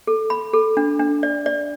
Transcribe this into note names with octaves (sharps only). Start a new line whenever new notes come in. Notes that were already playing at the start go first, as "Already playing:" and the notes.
A4
B5
A4
D4
D4
D5
D5